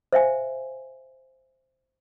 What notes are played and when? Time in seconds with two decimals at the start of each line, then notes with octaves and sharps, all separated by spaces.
0.13 C5 E5 F5 G#5